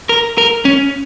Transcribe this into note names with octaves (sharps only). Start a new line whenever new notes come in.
A#4
A#4
C#4